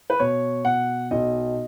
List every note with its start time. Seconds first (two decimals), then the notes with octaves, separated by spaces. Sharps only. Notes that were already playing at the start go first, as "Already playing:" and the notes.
0.10 B4
0.20 B2 C#5
0.65 B2 F#5
1.11 B1 D#5